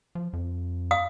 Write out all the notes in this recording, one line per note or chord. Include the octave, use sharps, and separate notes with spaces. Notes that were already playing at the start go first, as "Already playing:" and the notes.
F3
F2
F5 D#6